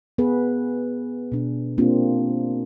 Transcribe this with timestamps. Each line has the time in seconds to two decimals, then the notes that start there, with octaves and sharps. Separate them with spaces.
0.18 B3 G#4 B4
1.32 B2 D4
1.78 A#3 C4 D4 F4 G4